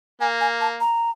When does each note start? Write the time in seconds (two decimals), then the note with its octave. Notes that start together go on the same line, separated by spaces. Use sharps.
0.21 A#3 G#5
0.41 G#5
0.61 A5
0.80 A#5